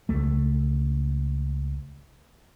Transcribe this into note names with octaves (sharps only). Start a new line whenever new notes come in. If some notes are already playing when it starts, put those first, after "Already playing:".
C#2 A3